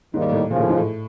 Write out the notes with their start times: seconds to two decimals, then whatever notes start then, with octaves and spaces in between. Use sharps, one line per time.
0.13 D#2 G#2 D#3 G3 A#3 D#4
0.32 A2
0.51 D#2 A#2 C#3 F3
0.60 A2
0.69 G#2
0.77 A2